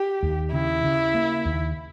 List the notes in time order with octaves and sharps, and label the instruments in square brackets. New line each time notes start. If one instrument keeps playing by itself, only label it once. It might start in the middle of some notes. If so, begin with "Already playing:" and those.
Already playing: [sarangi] G4
[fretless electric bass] D#2
[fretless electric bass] C#3 [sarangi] E4
[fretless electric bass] C#3
A#3
D#2